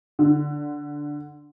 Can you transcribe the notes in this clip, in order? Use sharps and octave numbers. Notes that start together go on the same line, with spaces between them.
D3